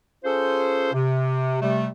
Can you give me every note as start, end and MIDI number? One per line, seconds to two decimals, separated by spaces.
0.24 0.91 61
0.24 0.91 65
0.24 0.91 68
0.24 0.91 69
0.24 0.91 72
0.93 1.58 48
1.61 1.88 48
1.61 1.88 55
1.61 1.88 57